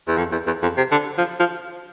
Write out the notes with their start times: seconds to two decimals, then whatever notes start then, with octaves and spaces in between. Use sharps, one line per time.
0.08 E2
0.18 F2
0.32 E2
0.47 E2
0.63 F2
0.77 C3
0.91 D3
1.18 F3
1.40 F3